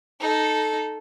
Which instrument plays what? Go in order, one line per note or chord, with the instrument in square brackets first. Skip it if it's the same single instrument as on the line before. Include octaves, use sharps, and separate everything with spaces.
[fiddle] D#4 A4